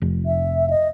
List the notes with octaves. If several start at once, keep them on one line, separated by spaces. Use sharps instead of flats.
F1
E5
D#5